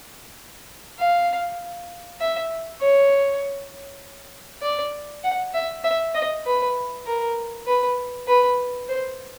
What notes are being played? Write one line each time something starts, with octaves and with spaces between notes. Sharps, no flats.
F5
E5
C#5
D5
F#5
E5
E5
D#5
B4
A#4
B4
B4
C5